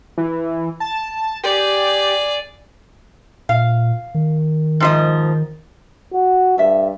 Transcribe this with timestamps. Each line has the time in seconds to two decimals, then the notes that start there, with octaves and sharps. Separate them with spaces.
0.18 E3
0.80 A5
1.44 G4 G#4 D5
3.49 A#2 F5
4.15 D#3
4.80 G#2 F3 D#5
6.13 F#4
6.58 G2 A4 E5